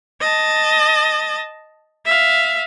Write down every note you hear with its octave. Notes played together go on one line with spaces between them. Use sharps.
D#5 A5
E5 F5